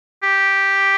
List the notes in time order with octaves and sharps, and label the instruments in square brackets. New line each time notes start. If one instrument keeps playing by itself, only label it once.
[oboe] G4